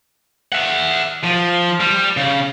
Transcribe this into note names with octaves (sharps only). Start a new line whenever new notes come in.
E5 F#5
F3
G3
C#3